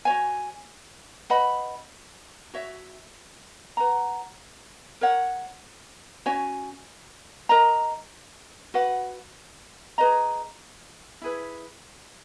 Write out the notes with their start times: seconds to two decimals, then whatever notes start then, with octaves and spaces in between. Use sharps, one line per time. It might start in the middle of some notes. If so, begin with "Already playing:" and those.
0.05 F#4 C#5 G#5
1.30 B4 D#5 F#5 B5
2.54 F#4 C#5 E5
3.77 B4 F#5 A#5
5.01 A#4 C#5 F#5
6.26 C#4 F#4 C#5 G#5
7.49 A#4 D#5 A#5
8.74 F#4 B4 F#5
9.98 G#4 B4 D#5 A#5
11.22 E4 G#4 B4